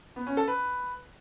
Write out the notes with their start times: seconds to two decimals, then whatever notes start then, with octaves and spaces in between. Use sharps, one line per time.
0.16 B3
0.27 C#4
0.37 A4
0.48 B4